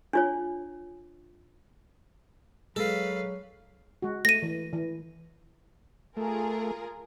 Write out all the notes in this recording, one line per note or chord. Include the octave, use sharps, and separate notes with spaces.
D4 F4 C#5
F#3 G#3 A4 B4 F5
G#3 F#4
A3 A#6 D#7
E3
E3
A3 F4 G#4 A#4